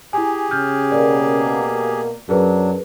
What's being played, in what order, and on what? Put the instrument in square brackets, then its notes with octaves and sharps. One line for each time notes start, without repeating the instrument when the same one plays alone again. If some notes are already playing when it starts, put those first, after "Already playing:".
[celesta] E4 G#5 [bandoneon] G4 G#4
[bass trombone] C#3 [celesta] F6 G6
[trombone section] B2 A#3 [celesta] A#4 D5
[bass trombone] F#2 [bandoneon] F#3 D4 [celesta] G#4 A#4 B4